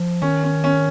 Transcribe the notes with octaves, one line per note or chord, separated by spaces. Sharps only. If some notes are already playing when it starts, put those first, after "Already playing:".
Already playing: F3
D#3 C#4
C#4
C#4